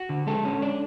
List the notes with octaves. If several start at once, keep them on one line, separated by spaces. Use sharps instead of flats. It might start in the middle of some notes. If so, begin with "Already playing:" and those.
Already playing: F#4
D3
G#3 A4
C#4
D4 D5